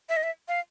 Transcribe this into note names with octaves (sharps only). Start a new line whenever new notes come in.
E5
D#5
E5
F5